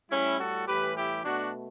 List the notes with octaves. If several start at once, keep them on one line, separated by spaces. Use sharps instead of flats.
A2 G3 C#4 E4
F#4 A4
A2 E3 G3 G4 B4
E4 G4
B2 A3 D4 F#4